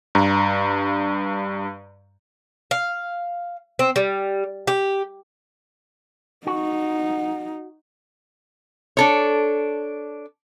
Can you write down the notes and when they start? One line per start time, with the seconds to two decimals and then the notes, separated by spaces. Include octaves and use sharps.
0.15 G2 A#5
2.71 F5
3.79 C4
3.96 G3
4.67 G4
6.47 D#4 F#4
8.97 D4 A4 C#5